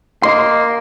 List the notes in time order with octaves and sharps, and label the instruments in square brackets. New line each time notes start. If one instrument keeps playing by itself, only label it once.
[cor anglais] A#3 [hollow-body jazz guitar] D#5 C6